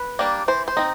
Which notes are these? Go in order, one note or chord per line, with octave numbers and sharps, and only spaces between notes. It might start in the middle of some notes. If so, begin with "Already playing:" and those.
Already playing: B4
G3 A#3 D4
E3 C5
C5
C4 D#4